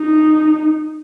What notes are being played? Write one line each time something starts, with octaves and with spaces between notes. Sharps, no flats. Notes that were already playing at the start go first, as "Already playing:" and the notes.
Already playing: D#4